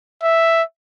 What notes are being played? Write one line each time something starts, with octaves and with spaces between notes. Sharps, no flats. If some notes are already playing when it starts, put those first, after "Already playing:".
E5